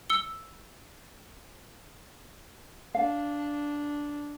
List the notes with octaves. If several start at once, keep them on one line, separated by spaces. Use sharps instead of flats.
E6 C#7 G7
D4 F5